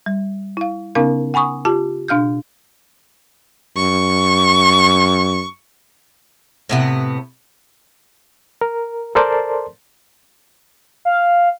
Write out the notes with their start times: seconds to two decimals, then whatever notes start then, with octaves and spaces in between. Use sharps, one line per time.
0.06 G3
0.57 E4 F5
0.95 C#3 B3 C#4 D#4 A#4 F5
1.34 F#5 G#5 B5 C#6 D#6
1.65 F4 G4 A5
2.08 B2 D4 F5 F6 G6
3.77 F#2 C#6
6.69 A2 C3 B3
8.61 A#4
9.15 A4 A#4 C5 D5 A5 C6
11.05 F5